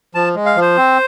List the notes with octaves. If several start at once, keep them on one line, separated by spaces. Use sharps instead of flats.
F3 A5
G#3
F5
F3
C5
C4